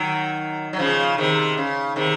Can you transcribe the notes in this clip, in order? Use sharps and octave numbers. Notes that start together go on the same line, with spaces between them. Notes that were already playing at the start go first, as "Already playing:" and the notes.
Already playing: D#3 F#3
F#3
C#3 F3
C3 D#3
C#3
C3 D#3